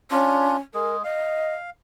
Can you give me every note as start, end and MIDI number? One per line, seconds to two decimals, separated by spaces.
0.11 0.57 61
0.11 0.57 62
0.11 0.57 65
0.74 1.03 56
0.74 1.03 68
0.74 0.97 70
1.04 1.55 75
1.04 1.70 77